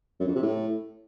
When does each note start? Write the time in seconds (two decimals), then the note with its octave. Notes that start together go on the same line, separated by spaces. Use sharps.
0.20 F#2
0.27 F2
0.35 C3
0.43 A2